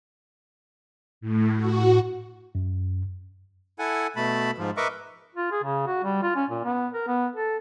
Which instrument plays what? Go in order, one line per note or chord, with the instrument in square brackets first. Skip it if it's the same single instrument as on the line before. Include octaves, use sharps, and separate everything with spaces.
[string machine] A2
F#4
[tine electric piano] F#2
[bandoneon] E4 A4 F#5 G#5
B2 A3 A5 B5
G#2 F3
A#4 B4 D#5 E5 C#6 D6
[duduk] F4
G#4
C#3
F#4
G3
F4
C#4
A#2
B3
A#4
B3
A4